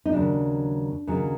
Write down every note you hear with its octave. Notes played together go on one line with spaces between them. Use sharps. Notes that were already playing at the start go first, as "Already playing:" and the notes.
D#4
D#2 C#3 F#3 D4
D#2 C#3 F#3